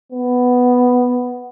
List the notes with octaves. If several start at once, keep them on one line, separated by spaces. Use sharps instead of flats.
B3